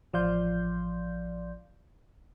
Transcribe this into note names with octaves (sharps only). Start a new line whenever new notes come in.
A1 F3 D5 F5 C6 G6